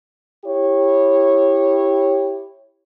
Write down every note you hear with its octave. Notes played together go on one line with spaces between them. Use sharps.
E4 G4 C#5